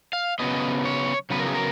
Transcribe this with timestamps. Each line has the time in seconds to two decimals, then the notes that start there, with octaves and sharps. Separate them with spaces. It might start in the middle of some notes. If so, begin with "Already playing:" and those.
0.13 F5
0.39 C#3 F#3 B3 D#5
0.85 C#5
1.30 C#3 F#3 B3 B4
1.39 A#4
1.47 G#4
1.54 A#4